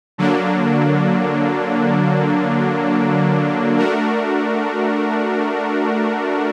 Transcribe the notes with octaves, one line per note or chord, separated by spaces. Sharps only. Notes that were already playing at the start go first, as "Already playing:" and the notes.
D3 F#3 A#3 D4
A3 D4 F#4 A#4